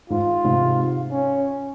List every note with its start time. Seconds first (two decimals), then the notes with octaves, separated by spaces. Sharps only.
0.10 G#2 F4
0.44 G#2 C3
1.12 C#4